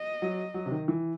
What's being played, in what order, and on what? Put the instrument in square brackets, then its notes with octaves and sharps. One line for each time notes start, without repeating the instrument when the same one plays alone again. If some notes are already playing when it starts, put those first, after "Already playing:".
Already playing: [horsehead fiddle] D#5
[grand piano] F#3
F#3
C3
D#3
E3